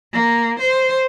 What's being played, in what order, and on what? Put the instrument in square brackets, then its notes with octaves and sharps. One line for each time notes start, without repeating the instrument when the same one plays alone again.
[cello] A#3
C5